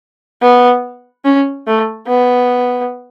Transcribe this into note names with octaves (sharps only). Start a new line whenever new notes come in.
B3
C#4
A3
B3